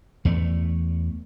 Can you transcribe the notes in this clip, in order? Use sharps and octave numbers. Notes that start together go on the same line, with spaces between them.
E2 A3